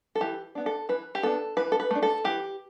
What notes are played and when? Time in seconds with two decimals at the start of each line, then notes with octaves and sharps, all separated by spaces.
0.15 A4
0.21 E3 G4
0.55 B3 D4
0.66 A4
0.89 E3 B4
1.15 G4
1.23 B3 D4 A4
1.57 E3 B4
1.72 A4
1.80 B4
1.91 A3 D4
2.02 A4
2.24 E3 G4